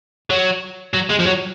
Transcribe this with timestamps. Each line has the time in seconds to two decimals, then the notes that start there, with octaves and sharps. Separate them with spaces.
0.31 F#3
0.94 F#3
1.11 G#3
1.20 F3
1.27 F#3